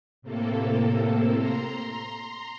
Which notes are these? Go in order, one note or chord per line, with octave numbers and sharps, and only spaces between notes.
A2 C3 A#3 A4
A#5 C6